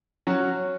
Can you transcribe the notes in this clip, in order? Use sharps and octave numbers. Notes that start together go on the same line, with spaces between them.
F#3 C#4 F#4